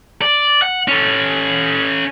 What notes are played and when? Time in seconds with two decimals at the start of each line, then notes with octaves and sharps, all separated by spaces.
0.22 D5
0.62 F#5
0.88 C#4 A4